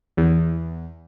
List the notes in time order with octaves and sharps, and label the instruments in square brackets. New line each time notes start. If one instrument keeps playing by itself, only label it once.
[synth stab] E2